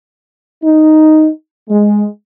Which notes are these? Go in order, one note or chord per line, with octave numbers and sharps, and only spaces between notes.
D#4
G#3